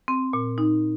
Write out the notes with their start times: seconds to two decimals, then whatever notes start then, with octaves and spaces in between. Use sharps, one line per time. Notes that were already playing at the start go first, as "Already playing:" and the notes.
0.08 C4
0.33 A#2
0.58 D#4